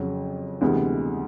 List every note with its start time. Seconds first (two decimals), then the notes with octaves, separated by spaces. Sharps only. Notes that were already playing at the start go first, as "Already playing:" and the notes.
Already playing: F2 C#3 F#3
0.61 D2 C3 E3 G#3 B3